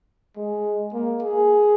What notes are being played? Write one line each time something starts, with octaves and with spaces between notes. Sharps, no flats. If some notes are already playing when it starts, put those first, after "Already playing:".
G#3
A#3
G#4